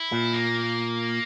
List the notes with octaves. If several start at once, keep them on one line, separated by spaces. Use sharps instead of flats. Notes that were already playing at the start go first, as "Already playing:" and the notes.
Already playing: E4
A#2
A#3